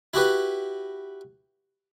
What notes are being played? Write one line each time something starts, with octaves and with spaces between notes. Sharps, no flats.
E4 F#4 G4 B4